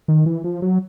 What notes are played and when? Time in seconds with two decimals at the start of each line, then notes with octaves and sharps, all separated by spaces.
0.08 D#3
0.26 E3
0.44 F3
0.62 F#3